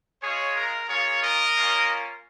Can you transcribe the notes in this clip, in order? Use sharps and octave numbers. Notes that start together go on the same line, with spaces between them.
G#3 F4 G#4 C#5
A#4
A#3 C#4 F4 G#4 C#5
A#4 D#5
A#3 C#4 F4